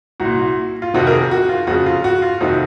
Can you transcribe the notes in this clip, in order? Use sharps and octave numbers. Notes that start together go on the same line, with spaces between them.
C2 F#4
A#2
F4
F2 C3 D#3 F#4
A#4
G#4
F#4
F4
F2 C#3 F#4
F4
F#4
F4
F2 C3 D#3 F#4